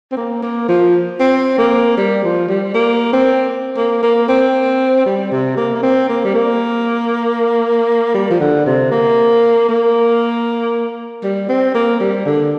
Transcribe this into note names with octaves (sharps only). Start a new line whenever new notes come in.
C4
A#3
A#3
F3
C4
A#3
G3
F3
G3
A#3
C4
A#3
A#3
C4
G3
C3
A#3
A#3
C4
A#3
G3
A#3
G3
F3
D3
C3
A#3
A#3
G3
C4
A#3
G3
D3